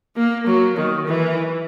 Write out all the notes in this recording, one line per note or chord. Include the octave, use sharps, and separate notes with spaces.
A#3
F#3
D#3
E3